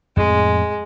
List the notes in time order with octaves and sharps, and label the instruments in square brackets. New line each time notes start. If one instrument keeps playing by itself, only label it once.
[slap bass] F2 A2 C4 [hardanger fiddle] G#3